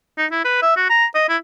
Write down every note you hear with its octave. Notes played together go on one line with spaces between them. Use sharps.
D#4
E4
B4
E5
F#4
A#5
D#5
E4